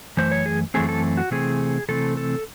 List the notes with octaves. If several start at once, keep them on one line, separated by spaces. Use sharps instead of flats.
F#2 E3 A3 C5
C#5
G#4
F#2 E3 A3 C4 G#4
A4
F#4
C3 E3 A3 C4 G#4
C3 E3 A3 C4 A4
A4